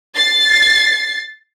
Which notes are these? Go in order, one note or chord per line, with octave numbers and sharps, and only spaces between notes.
A6 C7